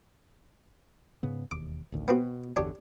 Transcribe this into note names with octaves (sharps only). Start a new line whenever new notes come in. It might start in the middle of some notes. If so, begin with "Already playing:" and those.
G#2 C#3 B3
E1 D#2 D6
A1 D2 D#3
B2 B3 C4 F#4
G1 E2 D3 D4 G4 C#5